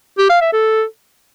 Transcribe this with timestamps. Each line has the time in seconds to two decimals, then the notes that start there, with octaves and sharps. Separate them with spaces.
0.18 G4
0.30 F5
0.41 E5
0.53 A4